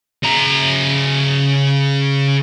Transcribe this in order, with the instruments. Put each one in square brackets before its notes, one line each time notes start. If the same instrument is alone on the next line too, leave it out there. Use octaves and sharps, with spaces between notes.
[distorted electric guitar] C#3 A#5